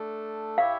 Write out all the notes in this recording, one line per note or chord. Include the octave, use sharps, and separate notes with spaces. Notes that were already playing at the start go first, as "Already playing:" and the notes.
Already playing: A3 D4 A4
E4 G4 C#5 E5 F5